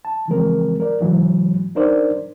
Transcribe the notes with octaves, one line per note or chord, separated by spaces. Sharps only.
A5
C#3 E3 F3 G#3 C4 A#4
A#4 D5
G#2 C#3 E3 F#3 G#3
D4 D#4 A#4 C5 D5